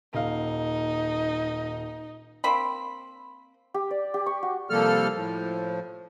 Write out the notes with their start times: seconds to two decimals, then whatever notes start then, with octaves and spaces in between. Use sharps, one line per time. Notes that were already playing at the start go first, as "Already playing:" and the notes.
0.14 D#1 D#4 F5
2.44 A#3 C4 B5
3.74 G4
3.91 D5
4.14 G4
4.26 C#6
4.43 F#4
4.70 C3 F3 G3 A#3 A4 F6
5.15 A2 F3